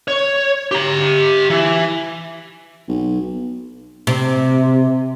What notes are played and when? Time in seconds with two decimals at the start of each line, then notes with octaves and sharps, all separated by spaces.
0.08 C#5
0.71 G4 A#5
1.50 E3
2.88 B1
4.07 C3